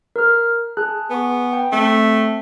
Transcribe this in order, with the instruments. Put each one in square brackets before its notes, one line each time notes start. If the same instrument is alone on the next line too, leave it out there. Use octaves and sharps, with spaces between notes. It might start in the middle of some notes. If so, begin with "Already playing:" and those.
[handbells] A#4 F6
G#4 A5 F#6
[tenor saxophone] B3 [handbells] G#5 C#6
[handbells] G5
[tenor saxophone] A3 [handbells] C4